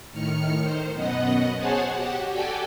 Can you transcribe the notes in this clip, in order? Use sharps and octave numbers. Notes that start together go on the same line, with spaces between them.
A2 D#3 F6 C#7
D#3 C5
F#2 B2 B3 D#5 F#5
G#4 C5 C#5 F#5 G#5 A5
F#4 G4 F#5
F#4 G4 A4 D5 G5 G#5